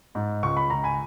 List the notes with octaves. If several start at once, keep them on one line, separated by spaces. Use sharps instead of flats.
G#2
C#2 C#6
B5
C#2 A#5
G#5 B5